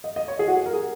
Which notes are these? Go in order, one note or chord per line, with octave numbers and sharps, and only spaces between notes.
D#5
D#5
C#5
G#4
F#4
G#4
A#4
G#4